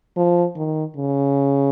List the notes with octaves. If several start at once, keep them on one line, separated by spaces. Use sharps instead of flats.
F3
D#3
C#3